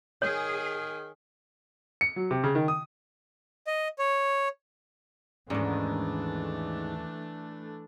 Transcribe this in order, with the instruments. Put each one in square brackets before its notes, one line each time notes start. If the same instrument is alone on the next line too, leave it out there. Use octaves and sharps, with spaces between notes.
[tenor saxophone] D#3 [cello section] G#4 [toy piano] C#5
[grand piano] C#7
F#3
C3
C#3
D#3
D#6
[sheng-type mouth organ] D#5
C#5
[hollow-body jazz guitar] D#2 C#4 D5 [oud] G#2 D#3 [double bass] E3 [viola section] A3 D4